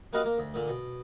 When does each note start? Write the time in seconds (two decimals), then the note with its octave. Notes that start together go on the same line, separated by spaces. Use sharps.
0.13 A#3 F#4 G4 B4 D#5 F5
0.25 A#3
0.38 D2
0.54 A#2 D3
0.68 B2